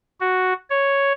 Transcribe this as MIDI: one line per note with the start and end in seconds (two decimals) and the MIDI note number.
0.20 0.53 66
0.70 1.13 73